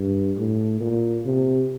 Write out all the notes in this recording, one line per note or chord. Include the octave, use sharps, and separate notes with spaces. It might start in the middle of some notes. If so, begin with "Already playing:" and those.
Already playing: G2
A2
A#2
C3